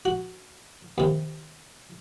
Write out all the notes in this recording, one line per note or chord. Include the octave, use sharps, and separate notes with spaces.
F#4
D#2 C3